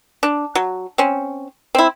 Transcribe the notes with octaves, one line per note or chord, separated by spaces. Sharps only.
D4
F#3
C4 C#4
C4 E4